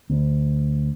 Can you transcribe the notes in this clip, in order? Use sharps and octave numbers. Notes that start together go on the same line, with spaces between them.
D2